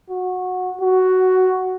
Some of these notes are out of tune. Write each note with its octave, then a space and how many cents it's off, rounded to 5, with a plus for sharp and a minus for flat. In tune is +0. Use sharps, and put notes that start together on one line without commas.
F#4 -15
F#4 +5